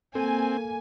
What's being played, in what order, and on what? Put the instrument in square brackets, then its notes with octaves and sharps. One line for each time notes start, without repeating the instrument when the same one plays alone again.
[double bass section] A#3 [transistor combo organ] C4 [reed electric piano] A4 [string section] G#5